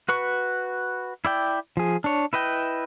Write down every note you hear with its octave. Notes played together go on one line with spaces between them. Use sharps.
F#4 B4 C#6
E4 D5 G5
F3 G#4
D4 C#5
E4 B4 D#5 G5